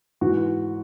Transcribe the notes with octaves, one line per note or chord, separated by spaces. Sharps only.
G#2 E3 F#4